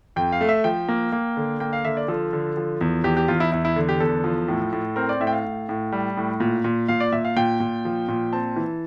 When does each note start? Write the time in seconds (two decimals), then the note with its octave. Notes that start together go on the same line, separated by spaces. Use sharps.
0.16 F2 G5
0.32 F5
0.41 A3
0.49 E5
0.64 F3 G5
0.88 A#3
1.12 A#3
1.37 D3
1.60 A#3 G5
1.73 F5
1.84 D3 E5
1.97 D5
2.08 F3 A4
2.33 D3
2.57 F3
2.81 E2
3.04 E2 G4
3.17 G4
3.28 E2 F4
3.40 E4
3.52 E2 E4
3.65 E4
3.76 D3
3.89 G4
4.00 E2 A4
4.24 F3
4.48 A2
4.72 A2
4.96 C4 A#4
5.09 D5
5.20 A2 E5
5.27 G5
5.33 F5
5.44 A2
5.69 A2
5.92 G3
6.17 A2
6.40 A#2
6.64 A#2
6.88 A#2 F5
7.00 D5
7.12 A#2 E5
7.25 F5
7.37 A#2 G5
7.60 A#2
7.85 F3
8.08 A#2
8.33 C4 A5
8.56 E3